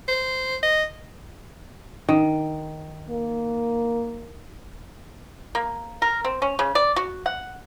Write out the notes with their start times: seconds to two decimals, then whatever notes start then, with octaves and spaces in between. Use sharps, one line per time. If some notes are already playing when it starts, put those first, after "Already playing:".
0.08 C5
0.63 D#5
2.09 D#3
3.10 A#3
5.55 A#3
6.02 A#4
6.25 C4
6.42 C#4
6.59 C#3
6.75 D5
6.96 F#4
7.26 F#5